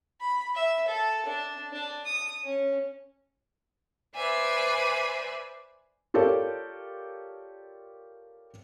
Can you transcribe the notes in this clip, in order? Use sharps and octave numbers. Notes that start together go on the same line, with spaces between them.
B5
E5
A4
D4
D4
D#6
C#4
B4 C5 D5 E5 G#5
F4 G4 A4 A#4 C#5 D5